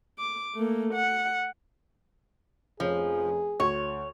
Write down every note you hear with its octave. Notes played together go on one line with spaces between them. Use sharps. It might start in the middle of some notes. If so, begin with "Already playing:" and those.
D6
A3 A#3
F#5
F1 F3 C#4 G#4 C#5
D2 C#5